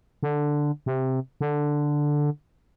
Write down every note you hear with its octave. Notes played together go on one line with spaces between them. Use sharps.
D3
C3
D3